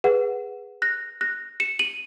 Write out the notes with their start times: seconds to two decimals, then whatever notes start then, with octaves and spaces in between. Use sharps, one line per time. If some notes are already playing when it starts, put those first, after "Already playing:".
0.04 G#4 B4 F#5
0.82 F#6 A#6
1.21 F#6 A#6
1.60 C#7 E7
1.79 D#7 F#7